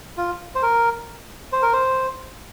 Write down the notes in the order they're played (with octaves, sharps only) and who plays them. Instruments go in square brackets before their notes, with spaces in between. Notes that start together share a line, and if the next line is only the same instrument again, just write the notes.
[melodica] F4
C5
A#4
C5
A#4
C5